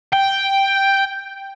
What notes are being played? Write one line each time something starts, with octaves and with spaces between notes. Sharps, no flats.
G5